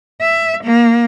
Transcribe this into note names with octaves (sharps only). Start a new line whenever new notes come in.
E5
A#3